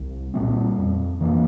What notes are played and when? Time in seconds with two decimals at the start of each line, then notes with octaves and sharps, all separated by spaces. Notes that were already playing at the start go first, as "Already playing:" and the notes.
Already playing: C2
0.34 A#2 G3 C4
0.78 F2
1.20 E3 A#3 D4